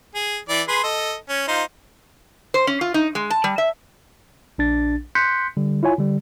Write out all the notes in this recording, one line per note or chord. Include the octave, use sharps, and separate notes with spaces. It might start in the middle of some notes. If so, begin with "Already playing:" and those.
G#4
E3 D5
G#4 B4 C6
A4 D#5
C#4
D#4 F4 C5
C5
C#4
F4
D#4
G#3
A5
G3
E5
A#1 D4 A6
C6 F#6 G6 B6 C#7
D3 G3
E4 F4 C#5 G#5
D3 G3